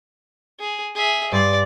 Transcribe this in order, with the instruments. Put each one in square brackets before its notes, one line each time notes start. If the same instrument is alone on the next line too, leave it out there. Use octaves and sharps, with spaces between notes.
[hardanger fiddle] G#4
G#4 E5
[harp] G2 C6 C7 [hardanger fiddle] D5